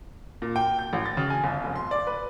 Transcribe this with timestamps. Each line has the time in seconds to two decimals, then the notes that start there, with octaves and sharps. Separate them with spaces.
0.42 A#2
0.56 G5
0.79 G6
0.93 A1
1.06 A6
1.17 C#3
1.30 G#5
1.44 G1
1.64 F1
1.76 C6
1.91 D5
2.07 B4